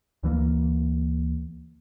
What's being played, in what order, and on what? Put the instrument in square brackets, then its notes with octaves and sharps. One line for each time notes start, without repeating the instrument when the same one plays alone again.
[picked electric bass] D2 E3 A3 A#3